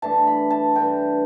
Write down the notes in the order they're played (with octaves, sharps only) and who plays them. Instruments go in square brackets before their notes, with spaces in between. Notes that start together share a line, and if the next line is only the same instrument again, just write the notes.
[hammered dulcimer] G2 E3 A3 D4 A5
B5
A5
G2 E3 A3 D4 G5